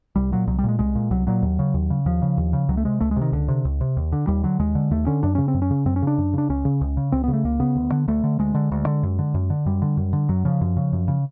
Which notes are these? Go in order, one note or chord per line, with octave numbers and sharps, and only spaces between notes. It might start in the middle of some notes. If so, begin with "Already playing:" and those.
C2 G3
A#2 F#3
C2 F#3
G3
A#2 G#3
C2 G#3
A#2
C2 F#3
A#2 F#3
D#2
C#3
D#2
C#3
D#2 F3
C#3
D#2
C#3
C#2 F#3
A3
C3 G#3
C#2 A3
G#3
C3
D#3
C#2 D3
C3
C#2
C3
D#2
D3
D#2 G3
D3 F#3
D#2 G#3
D3
D#2 A3
D3 C#4
F#2 D4
C#3 C#4
C4
F#2
C#4
C#3
F#2 C4
C#4
C#3 D4
F#2
C#3 D4
C#2 C#4
C#3
C#2
C#3
C#2 C4
B3
C#3
A3
C#2 A#3
C#3 B3
D2
D3
D2 A3
D3
D2 G#3
D3
D2
D3
F#2
D3
F#2
D3
F#2 G3
D3
F#2
D3
F#2 F#3
C#3 F3
F#2
C#3
F#2
C#3